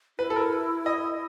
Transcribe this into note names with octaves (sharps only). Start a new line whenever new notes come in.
E4 B4
A4
A#4
D#5